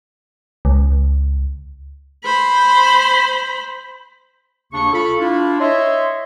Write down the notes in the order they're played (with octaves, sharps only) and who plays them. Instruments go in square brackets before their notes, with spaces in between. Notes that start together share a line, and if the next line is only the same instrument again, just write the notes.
[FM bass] C#2
[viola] C5 B5
[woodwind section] D#2 C#3 A#3 D4 C#6
F4 A4 B5 C#6
D4 E4 F4
C#5 D#5 E5 C6